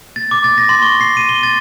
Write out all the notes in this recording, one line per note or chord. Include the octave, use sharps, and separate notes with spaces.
A6
D6
A6
A#6
C6
C#6
C7
D#7
G7
A6